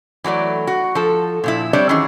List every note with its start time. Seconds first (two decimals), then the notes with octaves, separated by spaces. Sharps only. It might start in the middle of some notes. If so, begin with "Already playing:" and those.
0.24 E3 F#3 A3 D5
0.67 F#4
0.95 F3 A4
1.44 A#2 F3 E4
1.73 G3 C4 D4 C#5 D5
1.89 D#3 E3 F#3 C#4 G#4